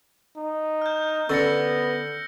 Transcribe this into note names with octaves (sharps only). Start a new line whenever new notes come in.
D#4
F6 G6
D3 B3 C#4 A4 E6 A#6 C#7